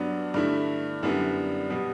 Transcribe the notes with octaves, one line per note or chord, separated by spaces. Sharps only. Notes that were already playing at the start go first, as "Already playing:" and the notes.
Already playing: G2 F#3 B3 D4
G2 D3 A3 E4
F#2 D3 G3 B3 E4
B2 G3 B3